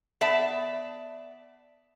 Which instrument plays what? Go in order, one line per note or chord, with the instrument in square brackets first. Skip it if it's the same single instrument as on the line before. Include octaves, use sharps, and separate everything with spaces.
[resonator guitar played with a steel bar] B3 D5 E5 A5